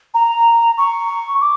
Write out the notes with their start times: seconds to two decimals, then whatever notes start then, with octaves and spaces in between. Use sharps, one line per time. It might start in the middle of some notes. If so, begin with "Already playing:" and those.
0.14 A#5
0.78 C#6
1.41 D6